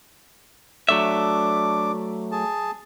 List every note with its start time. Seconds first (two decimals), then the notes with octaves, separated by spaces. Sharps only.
0.89 F#3 A3 D4 E5 D6
2.32 G#4 A5